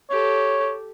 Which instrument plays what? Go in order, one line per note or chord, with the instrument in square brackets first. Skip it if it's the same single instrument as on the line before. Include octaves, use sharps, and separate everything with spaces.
[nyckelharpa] G4 A4 [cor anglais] C#5